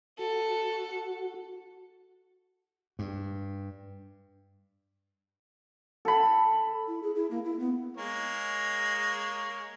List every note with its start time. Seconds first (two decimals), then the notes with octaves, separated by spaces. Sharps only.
0.19 F#4 A4
2.99 G2
6.05 A4 B5
6.88 E4
7.03 G#4
7.15 E4
7.31 A#3
7.45 E4
7.59 B3
7.97 G#3 A#3 C#5